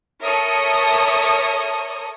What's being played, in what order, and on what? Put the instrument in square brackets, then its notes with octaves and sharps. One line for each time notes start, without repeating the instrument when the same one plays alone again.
[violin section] A4 A#4 C#5 E5 C#6 D#6